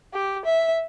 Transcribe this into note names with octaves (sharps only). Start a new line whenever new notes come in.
G4
E5